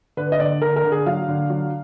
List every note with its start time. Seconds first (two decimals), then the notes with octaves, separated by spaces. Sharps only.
0.17 D3 B4
0.32 D#5
0.39 D3 D5
0.62 D3 A#4
0.76 A#4
0.84 D3
0.92 G#4
1.06 F#3 F5
1.28 D3
1.50 F#3